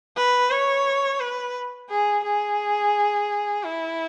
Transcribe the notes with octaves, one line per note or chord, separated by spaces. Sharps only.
B4
C#5
B4
G#4
G#4
E4